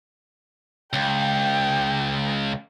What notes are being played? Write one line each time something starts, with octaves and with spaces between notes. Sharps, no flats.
C#2 G5